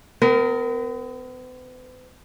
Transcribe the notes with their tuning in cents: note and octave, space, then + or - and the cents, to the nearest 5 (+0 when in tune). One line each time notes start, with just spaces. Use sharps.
B3 +45 A#4 -5